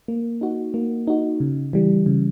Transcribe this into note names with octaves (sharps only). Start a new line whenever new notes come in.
A#3
D#4 F#4
A#3
D#4 F#4
C#3
E3 G3
C#3